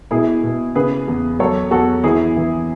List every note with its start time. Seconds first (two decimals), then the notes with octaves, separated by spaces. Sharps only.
0.11 B2 E4 G#4
0.43 B2
0.75 C#3 G#4 B4
1.08 E2
1.39 F#3 A4 C#5
1.71 E2 F#4 A4
2.03 E3 E4 G#4
2.36 E3